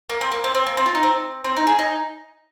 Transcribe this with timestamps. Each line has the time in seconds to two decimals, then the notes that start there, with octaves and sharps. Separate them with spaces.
0.09 A#3
0.21 C4
0.32 A#3
0.44 C4
0.55 C4
0.67 A#3
0.77 C4
0.86 F4
0.95 D#4
1.03 C4
1.44 C4
1.57 D#4
1.67 G#4
1.79 D#4